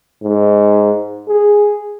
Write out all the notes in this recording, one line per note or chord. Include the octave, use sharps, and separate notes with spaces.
G#2
G#4